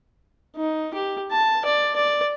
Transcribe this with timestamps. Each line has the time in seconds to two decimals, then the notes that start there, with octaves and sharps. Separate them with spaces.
0.56 D#4
0.94 G4
1.31 A5
1.65 D5
1.96 D5